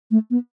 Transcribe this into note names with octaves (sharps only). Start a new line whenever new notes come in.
A3
B3